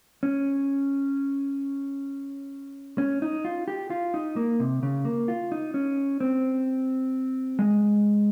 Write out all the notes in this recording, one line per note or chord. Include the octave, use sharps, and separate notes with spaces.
C#4
C#4
D#4
F4
G4
F4
D#4
A#3
C3
C#3
A#3
F4
D#4
C#4
C4
G#3